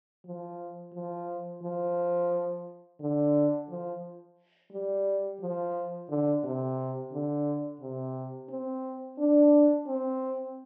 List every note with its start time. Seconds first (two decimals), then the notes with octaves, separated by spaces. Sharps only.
0.25 F3
0.94 F3
1.63 F3
3.00 D3
3.69 F3
4.72 G3
5.41 F3
6.09 D3
6.44 C3
7.12 D3
7.81 C3
8.49 C4
9.18 D4
9.87 C4